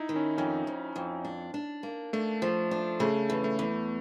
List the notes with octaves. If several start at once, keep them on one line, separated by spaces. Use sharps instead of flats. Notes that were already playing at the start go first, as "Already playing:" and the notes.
Already playing: D#4 E4
D#3
C#4
F2 C#4
F2
F2
D4
D4
A#3
A3 D4
F3
D4
C#3 A3
E2
A3
E2